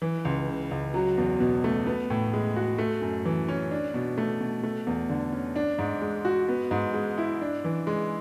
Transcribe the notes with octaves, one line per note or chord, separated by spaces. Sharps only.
E3
C#2
C#3
C#2
F#3
E2
B2
A3
B3
A2
G#3
F#4
A3
F#2
E3
C#4
D4
B2
A3
B2
A3
E2
D3
C#4
D4
G#2
G#3
F#4
B3
G#2
G#3
E4
D4
E3
G#3